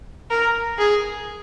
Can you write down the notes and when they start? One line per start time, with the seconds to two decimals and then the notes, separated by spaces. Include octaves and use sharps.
0.30 A#4
0.78 G#4